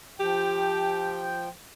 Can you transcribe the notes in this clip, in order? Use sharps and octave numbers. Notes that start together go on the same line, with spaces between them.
F3 G4 G5